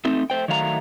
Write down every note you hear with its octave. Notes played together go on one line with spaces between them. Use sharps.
A3 C4 D#4
A3 C5 G5
D#3 F#3 A3 F5 A5 A#5